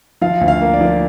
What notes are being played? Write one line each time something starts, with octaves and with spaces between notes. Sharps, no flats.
F3 F5
D2
F5
A#3
D5
F3